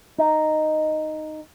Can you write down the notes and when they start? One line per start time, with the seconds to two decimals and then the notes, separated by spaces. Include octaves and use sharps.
0.18 D#4